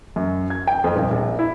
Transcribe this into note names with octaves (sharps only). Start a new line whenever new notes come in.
F#2
G#6
G5
F2
D#1
A#1
E4